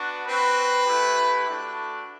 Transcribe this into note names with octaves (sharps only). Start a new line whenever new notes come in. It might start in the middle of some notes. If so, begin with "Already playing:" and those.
Already playing: B3 D4 F#4
C4 F#4 B4
A3 E4 G4
A3 D4 F#4